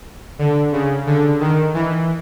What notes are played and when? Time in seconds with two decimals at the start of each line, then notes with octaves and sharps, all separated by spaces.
0.39 D3
0.72 C#3
1.06 D3
1.40 D#3
1.74 E3